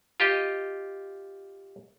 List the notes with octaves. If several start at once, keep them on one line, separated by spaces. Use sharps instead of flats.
F4 G4 D#5